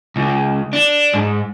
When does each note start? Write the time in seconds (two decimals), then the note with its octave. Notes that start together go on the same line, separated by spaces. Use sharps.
0.16 C#2
0.73 D4
1.14 G#2